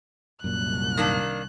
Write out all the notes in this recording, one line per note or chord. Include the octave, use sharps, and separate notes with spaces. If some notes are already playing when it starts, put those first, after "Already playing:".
C2 F#2 A#2 F#6
D#3 A#3 D4